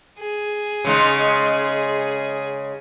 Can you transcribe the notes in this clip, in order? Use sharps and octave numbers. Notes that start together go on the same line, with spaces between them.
G#4
C#3 G#3 D#4